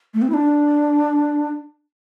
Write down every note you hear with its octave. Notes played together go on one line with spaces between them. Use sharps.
A3
C4
E4
D4